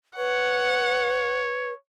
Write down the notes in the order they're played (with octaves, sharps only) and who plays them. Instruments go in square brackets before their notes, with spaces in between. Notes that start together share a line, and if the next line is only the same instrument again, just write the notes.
[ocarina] B4 [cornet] C#5 [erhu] F#5